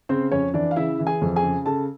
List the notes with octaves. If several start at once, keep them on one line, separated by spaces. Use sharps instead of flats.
C#3 C4 C5
F2 C#4 C#5
E3 D4 D5
F5
C#3 E4 E5
E3
G#4 G#5
F2
G#4 G#5
C#3
C#3 A4 A5